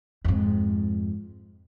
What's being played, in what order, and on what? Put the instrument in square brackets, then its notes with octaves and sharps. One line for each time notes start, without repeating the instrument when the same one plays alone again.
[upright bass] F2 G#2